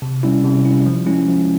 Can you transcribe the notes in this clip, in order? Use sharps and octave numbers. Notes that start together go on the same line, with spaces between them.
C3
G3 C#4 E4
C3
G3 C#4 E4
F3
G#3 C#4 E4
F3